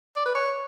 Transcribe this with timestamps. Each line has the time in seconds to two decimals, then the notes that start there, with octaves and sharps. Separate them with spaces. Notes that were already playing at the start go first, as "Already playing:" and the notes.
0.16 D5
0.25 B4
0.35 C#5